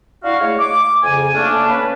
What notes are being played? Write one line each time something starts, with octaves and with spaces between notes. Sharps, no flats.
D4 E4 F#4 F5
G#3 A3 C#5
D6
F2 C#3 G#5
A3 A#3 C#4 D4
C#4 B4